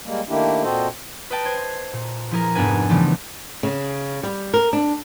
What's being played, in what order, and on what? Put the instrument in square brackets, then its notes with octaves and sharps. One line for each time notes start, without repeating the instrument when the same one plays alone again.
[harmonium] G3 G#3 A#3
D#3 A3 A#3 D4 E4 G4
A#2 C4 F#4 A4 C5 D#5
[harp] B4 D#5 G5 A5
C5 G#6
A#2
F3 E4 G#4 A#4
F1 G#2 B3 D4 B4 G#5
C#3 E3 F3 G3 A3 B3
[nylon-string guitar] C#3
G3
A#4
D4